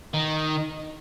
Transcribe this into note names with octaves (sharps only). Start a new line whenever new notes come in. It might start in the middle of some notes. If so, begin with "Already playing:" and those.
D#3